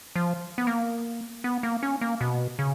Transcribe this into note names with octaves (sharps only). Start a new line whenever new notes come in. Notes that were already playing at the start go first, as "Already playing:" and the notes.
F3
B3
A#3
B3
A#3
C#4
A#3
B2
C#3